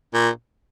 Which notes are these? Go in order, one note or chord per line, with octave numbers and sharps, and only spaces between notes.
A#2